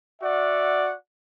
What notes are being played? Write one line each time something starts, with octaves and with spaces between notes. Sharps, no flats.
F#4 D5 E5 F#5